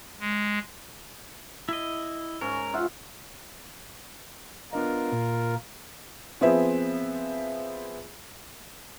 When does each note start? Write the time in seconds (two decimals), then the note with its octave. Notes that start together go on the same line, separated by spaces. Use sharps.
0.20 G#3
1.69 E4 D#5
2.41 G#2 C#4 A#4
2.74 F4 E5 F#5
4.73 B3 D4 F4 A#4 D#5
5.12 A#2
6.41 F3 B3 C4 G#4 B4 E5